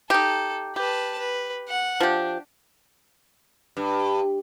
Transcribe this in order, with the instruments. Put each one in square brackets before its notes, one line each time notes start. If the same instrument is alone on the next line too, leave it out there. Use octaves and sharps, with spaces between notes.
[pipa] D#4 G4 [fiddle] A4
[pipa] G4 [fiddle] B4 A5
[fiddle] B4
F#5
[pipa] F3 G4 [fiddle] D4
[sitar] G2